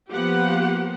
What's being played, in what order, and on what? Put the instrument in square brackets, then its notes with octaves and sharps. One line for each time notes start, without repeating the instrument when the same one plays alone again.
[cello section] F3 A#3 B3 [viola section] G4 F#5